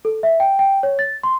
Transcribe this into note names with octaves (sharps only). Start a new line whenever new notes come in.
A4
E5
G5
G5
C#5
A6
C6